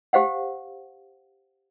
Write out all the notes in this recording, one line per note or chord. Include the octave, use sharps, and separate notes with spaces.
G4 C5 F5 F#5